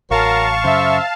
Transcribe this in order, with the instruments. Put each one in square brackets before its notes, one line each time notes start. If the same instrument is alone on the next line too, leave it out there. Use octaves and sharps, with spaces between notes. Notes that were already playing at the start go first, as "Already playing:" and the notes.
[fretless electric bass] A1 [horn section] F#3 A#4 [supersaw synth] F5 A5 [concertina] C#6
[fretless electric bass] F#2 C#3 [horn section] C5 E5